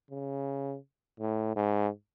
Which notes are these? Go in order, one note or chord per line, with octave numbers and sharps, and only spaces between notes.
C#3
A2
G#2